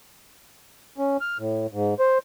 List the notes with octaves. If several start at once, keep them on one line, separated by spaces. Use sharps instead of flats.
C#4
F6
A2
G#2
C5